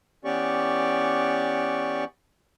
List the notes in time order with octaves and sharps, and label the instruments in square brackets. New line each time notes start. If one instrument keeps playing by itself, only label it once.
[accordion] E3 B3 C#4 G4 D5 C#6